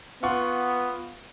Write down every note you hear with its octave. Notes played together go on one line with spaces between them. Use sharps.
B3 F4 F#5 C#6